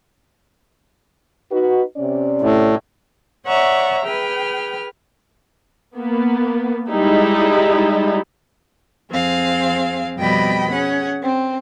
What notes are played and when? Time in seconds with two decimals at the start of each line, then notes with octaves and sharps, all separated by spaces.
1.52 D#4 F#4 B4
1.97 C3 C#4 D5
2.42 A2
3.47 C#5 D5 E5 F#5 A#5 C#6
4.05 G#4 B4 G5 F6
5.97 A#3 B3
6.90 G3 G#3 D#4 E4
9.11 F2 C4 G#4 F5
10.18 F2 B2 G3 D#5 G5 B5
10.71 C#4 G#4 F#5
11.22 C4